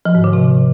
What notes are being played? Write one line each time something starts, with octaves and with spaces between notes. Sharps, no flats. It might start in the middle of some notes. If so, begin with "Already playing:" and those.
F3
G#2
D3
C3